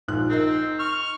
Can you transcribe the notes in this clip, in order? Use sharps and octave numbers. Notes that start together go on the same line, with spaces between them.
A#1 G#2 F#6
C4 D#4 A#4
C#6 F6